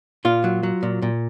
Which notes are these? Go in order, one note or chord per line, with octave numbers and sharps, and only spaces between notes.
A#2 F4
F#3
F#3
A#2
A#2